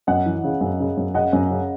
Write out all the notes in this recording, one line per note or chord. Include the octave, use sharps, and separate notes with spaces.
F#2 D#5 F#5
E3
C#3
F#2
C#3
F#2
C#3 D#5 F#5
F#2
C#3